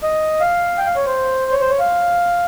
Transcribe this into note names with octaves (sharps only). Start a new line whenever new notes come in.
D#5
F5
G5
F5
C#5
C5
C#5
C5
C#5
F5